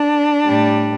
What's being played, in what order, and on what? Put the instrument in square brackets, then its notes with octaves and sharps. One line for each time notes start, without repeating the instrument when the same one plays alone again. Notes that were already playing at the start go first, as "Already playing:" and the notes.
Already playing: [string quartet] D4
A2 G3